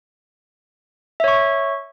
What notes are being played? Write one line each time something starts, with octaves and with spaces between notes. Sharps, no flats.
C#5 E5 C#6